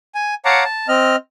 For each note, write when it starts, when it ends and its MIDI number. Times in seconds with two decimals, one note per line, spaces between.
0.15 0.34 80
0.45 0.64 73
0.45 0.64 77
0.45 0.64 78
0.45 0.64 81
0.45 0.64 82
0.45 0.64 86
0.65 0.87 81
0.88 1.16 60
0.88 1.16 75
0.88 1.16 89